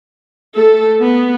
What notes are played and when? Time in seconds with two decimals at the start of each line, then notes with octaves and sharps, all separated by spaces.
0.56 A3 A4
1.00 B3